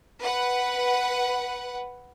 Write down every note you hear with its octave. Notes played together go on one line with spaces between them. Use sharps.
B4 F#5